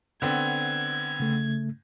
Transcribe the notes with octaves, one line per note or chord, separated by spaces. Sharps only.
D3 B3 C4 G#6
C#3 A3